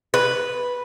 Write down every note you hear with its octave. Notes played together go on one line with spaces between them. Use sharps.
B4